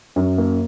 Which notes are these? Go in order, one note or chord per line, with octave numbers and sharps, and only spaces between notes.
F#2
A#3